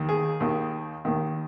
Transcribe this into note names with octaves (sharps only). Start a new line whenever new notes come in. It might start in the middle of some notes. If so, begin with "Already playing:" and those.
Already playing: D#2 D#3
G#4
D#2 D#3
D#2 D#3